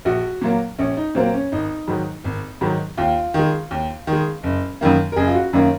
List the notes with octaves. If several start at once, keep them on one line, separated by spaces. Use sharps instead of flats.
A#1 F#4
A#2 F#3 A#3
A#1 C#4
D#4
A#2 F#3 A#3 C4
C#4
G#1 D#4
G#2 D#3 F#3
G#1
G#2 D#3 F#3
D#2 F4
D#3 G#3
D#2
D#3
G#3
F#1
F#2 D#3 A#3
A#4
F#1 G#4
F4
F#4
F#2 D#3 A#3 C#4